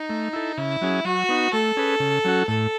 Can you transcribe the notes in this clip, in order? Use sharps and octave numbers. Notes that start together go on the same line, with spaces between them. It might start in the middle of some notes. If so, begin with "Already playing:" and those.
Already playing: D#4
A3
E4 A4
C#3 E4
F#3 C#4 G#4
F#3 F#4
B3 D#4
A3 A4
C#4 G#4 B4
C#3
F#3 C#4 F#4
A2 A4